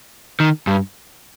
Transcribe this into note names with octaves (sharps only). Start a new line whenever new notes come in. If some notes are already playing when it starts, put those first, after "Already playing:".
D#3
G2